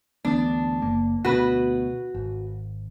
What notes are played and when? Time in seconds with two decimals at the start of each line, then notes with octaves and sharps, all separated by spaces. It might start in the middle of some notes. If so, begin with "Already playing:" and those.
0.25 D2 E3 B3 D4
0.82 F#1 A#3
1.25 D2 B2 F#4 B4
2.14 G#1